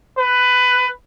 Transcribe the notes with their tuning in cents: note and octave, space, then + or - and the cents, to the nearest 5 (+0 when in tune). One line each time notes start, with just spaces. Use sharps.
B4 +15